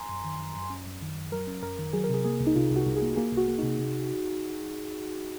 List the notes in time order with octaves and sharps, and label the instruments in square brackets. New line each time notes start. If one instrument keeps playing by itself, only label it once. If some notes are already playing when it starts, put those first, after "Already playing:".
Already playing: [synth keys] G#5 A#5 C6
[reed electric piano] F#2
D#3
F#2
F#2
C#4
F#2
D#3
F#2
[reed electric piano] F#3 [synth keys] A#4
[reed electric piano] C#4
[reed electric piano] F#2 [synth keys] A#4
[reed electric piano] D#3
[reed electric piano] F#3 [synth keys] G#4
[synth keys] A#4
[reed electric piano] C3 [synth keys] G#4
[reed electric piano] A#3 [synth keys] G#4
[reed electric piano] C2
[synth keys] D#4
[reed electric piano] C3 [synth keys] F4
[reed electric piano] C2 [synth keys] F#4
[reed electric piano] C2
[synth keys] G#4
[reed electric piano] A#3
[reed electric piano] A#3 [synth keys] G#4
[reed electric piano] C2 [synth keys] F#4
[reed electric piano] A#3
[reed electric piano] C3 [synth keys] D#4
[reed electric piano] C3